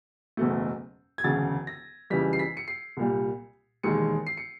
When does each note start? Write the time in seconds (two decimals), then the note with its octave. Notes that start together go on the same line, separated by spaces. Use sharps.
0.37 F#1 E2 B2 F#3 A3
1.18 G#6
1.24 E1 D2 C#3 F#3 A6
1.67 A#6
2.10 F2 C#3 E3 G3 B6
2.33 C7
2.39 B6
2.57 C#7
2.68 C7
2.97 C2 A#2 G3
3.83 E1 D#2 D#3 G#3 C#7
4.27 C7
4.37 C#7